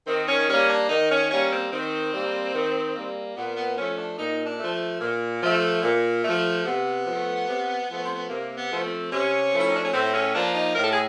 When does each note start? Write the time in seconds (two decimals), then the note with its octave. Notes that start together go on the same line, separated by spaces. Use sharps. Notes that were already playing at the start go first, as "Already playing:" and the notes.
0.07 D#3 C4
0.28 C#4
0.49 G3 A#3 C#4
0.70 D4
0.90 D#3 D#4
1.11 C#4
1.31 G3 A#3 C#4
1.51 C4
1.72 D#3 C4
2.13 G3 A#3
2.54 D#3
2.96 G3 A#3
3.36 A#2 B3
3.57 B3
3.77 F3 A3 C#4
3.98 D4
4.18 A#2 D#4
4.46 D4
4.59 F3 A3
5.01 A#2
5.42 F3 A3
5.83 A#2
6.24 F3 A3
6.65 C3 B3
7.06 F3 A3
7.47 C3
7.88 F3 A3
8.02 C4
8.16 B3
8.29 C3 A#3
8.56 B3
8.70 F3 A3
8.84 C4
9.11 C3 C#4
9.53 F3 A3
9.59 E4
9.68 D#4
9.76 D4
9.85 C#4
9.93 A2 C4
10.14 C#4
10.34 F3 A#3 D4
10.55 D#4
10.75 A2 A#4
10.84 A4
10.92 G#4